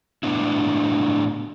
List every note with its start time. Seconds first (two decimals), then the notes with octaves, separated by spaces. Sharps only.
0.23 A2 B3 D4 E4